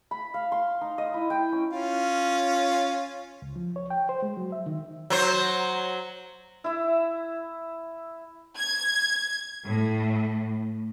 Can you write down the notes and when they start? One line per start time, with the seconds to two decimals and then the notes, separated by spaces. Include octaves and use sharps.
0.11 B5
0.34 F5
0.52 C6
0.81 D#4
0.98 D#5
1.14 E4
1.30 G5
1.52 C#4
1.72 C#4 F4
3.42 C#2
3.56 F3
3.76 C#5
3.90 G5
4.09 C5
4.22 G#3
4.37 F#3
4.52 E5
4.66 D#3
5.10 F#3 C5
6.64 E4 E5
8.57 G#6
9.66 A2